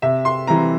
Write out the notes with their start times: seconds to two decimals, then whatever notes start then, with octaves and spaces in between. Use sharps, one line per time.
0.02 C3 E5
0.25 C6
0.47 E3 G3 C4 A#5